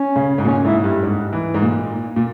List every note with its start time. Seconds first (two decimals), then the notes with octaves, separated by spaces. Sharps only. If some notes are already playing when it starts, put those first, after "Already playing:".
Already playing: C#4
0.16 C#3
0.38 G#2
0.44 A#2 C#4
0.64 G#2 E4
0.84 G2
1.03 G#2
1.33 E3
1.54 G#2
1.62 A#2
2.16 A#2